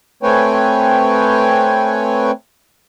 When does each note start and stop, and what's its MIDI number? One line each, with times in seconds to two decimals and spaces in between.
0.23 2.31 57
0.23 2.31 60
0.23 2.31 71
0.23 2.31 73
0.23 2.31 79
0.23 2.31 80